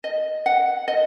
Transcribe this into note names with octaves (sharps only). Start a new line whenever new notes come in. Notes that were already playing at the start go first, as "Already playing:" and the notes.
D#5
F#5
D#5